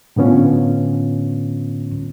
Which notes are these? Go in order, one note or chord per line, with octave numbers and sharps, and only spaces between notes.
A2 D3 B3 C#4 F4